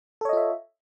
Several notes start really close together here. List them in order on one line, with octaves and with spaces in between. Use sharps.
A4 C#5 D#5 F4 E5